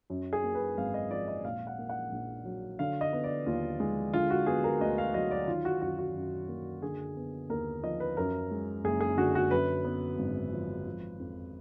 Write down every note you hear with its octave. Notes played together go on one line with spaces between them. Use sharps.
F#2
G#4
A#3
B4
G#1 F5
D#5
F3 D5
D#5
A#2 F5
F#5
A#3
F#5
A#1
F#3
D3 F5
D#5
B3
D5
D#2 F4
G#3
D3 F4
F#4
B3 G#4
A#4
D2 D#5
F5
F#3 D#5
D5
D#3 F4
F#4
F#2 F#4
F#4
F#2
A#3
D3 G#4
B3
D#2 A#4
F3 D#5
B4
F#2 A#4
G#3
F#1 G#4
G#4
D3 F#4
F#4
F#2 B4
B3
G#1
F3
F3
F2